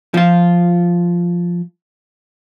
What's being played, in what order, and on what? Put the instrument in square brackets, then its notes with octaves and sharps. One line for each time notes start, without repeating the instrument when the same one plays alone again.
[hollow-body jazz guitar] F3 F4